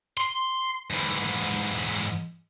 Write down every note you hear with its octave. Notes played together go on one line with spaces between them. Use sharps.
C6
G#2 E3